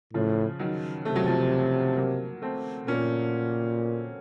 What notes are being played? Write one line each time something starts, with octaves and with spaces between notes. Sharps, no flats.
A2 C#3 F3
D#3 F#3
C3 A3
F#3
F3 A3
F#3 A#3
A3 C4
A#2 A#3 C#4